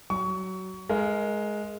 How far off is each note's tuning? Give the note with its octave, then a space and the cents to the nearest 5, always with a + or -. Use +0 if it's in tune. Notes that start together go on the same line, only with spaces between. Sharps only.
F#3 +20 C#6 +25
G#3 +10 A#4 +0 F5 -35